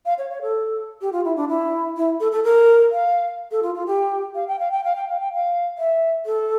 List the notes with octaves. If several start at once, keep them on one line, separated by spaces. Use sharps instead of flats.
F5
C#5
C#5
A4
G4
F4
E4
D4
E4
E4
A4
A4
A#4
F5
A4
F4
F4
G4
F5
G5
F5
G5
F5
G5
F5
G5
F5
E5
A4